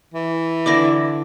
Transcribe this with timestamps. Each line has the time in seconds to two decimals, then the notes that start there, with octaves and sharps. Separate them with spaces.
0.14 E3
0.66 D3 E4 D5 D6 A#6